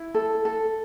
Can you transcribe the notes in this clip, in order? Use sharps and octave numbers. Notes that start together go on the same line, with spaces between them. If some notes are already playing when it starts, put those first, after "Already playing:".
Already playing: E4
A4
A4